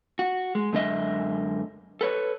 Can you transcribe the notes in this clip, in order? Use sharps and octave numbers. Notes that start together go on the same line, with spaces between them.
F#4
G#3
F#2 D3 G#3 D#5 E5
A4 B4 C#5